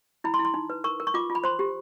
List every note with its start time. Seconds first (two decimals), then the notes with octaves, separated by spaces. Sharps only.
0.24 E4 B5
0.34 C6
0.39 E4
0.45 C6
0.54 D#4
0.70 B4
0.84 A#4 C#6
1.00 A#4
1.07 C#6
1.14 F4 D6
1.30 F4
1.35 B5
1.44 C5 C6
1.59 G4